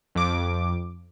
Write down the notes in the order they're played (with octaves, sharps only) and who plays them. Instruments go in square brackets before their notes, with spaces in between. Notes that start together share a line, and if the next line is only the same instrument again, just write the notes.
[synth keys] F2 D6